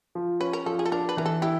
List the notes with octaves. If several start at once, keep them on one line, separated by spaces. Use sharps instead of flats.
F3
C#4 B4
A#4
F3 A4
G#4
A4
D4 A#4
B4
E3 A#4
A4
E4 G4